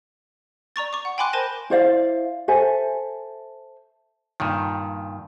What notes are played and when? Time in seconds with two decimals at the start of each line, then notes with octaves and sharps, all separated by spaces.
0.76 D5 A#5 C#6 A6
0.93 C#6 D6
1.05 F#5
1.18 G5 G#5 B5 C6 D6 F#6
1.33 A#4 C5 A5 A#6 D#7
1.70 E4 C5 D5 F5
2.48 A4 C5 E5 G#5
4.40 G2 A#2 D#3